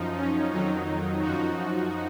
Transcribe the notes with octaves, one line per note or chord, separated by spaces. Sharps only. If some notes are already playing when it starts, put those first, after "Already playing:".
Already playing: F#2 F3 D#4
C#4
F2 D#3 F#3 D#4
F#2 F3 D#4 F#4